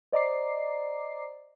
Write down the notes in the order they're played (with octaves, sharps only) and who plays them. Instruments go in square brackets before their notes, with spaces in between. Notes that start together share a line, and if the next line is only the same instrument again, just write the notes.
[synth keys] C5 D5 D#5 A#5 D6 C7